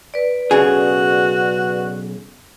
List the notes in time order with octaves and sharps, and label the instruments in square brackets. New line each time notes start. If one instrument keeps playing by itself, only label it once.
[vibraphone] B4 D5
[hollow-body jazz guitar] B1 C#3 G#4 [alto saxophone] F#4